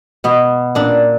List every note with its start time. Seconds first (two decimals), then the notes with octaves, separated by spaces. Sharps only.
0.24 B2 B3
0.75 A#2 D4